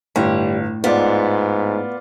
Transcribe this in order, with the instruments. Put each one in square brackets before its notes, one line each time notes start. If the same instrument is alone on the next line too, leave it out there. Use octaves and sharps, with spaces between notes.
[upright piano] G1 [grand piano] A2 [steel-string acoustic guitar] G3
[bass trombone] G#2 [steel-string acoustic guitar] B3 [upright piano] F4 D5